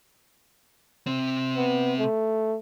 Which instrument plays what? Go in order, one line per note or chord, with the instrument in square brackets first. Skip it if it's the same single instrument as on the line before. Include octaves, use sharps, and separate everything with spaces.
[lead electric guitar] C3 C4
[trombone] B3
A3